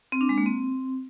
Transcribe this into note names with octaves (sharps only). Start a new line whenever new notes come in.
C4
D4
G#3
A#3
C4